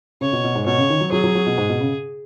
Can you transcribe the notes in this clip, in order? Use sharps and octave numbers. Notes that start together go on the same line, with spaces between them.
C#3 C#5
B2
B2
G#2
B2 C#5
C#3
D#3
F#3
F#3 G#4
F#3
F#3
B2
G#2
B2
C#3